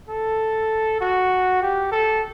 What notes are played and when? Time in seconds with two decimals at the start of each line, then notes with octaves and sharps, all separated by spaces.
0.10 A4
1.01 F#4
1.62 G4
1.92 A4